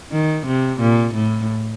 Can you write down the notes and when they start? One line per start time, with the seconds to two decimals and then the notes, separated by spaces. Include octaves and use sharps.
0.12 D#3
0.47 C3
0.80 A#2
1.15 A2